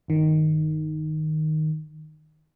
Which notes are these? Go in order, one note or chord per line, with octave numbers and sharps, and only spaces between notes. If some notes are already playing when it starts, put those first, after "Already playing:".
G1 D#3